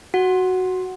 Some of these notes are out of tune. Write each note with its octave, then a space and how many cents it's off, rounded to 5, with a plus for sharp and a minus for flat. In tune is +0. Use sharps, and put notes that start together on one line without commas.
F#4 +0 F#5 +0